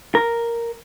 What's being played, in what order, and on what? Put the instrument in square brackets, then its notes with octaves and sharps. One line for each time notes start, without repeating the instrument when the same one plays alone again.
[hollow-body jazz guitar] A#4